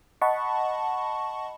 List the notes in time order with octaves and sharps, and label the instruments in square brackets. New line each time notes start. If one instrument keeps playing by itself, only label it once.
[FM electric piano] D#5 F#5 A5 B5 C#6